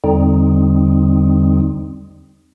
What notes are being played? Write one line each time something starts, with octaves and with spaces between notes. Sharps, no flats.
E2 D3 G3 C4 D#4